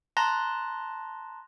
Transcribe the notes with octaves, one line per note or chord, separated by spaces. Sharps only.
A5 A#5 C6 F#6 A#6